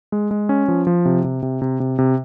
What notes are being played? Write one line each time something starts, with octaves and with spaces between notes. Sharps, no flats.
G#3
G#3
C#4
F3
F3
C3
C3
C3
C3
C3
C3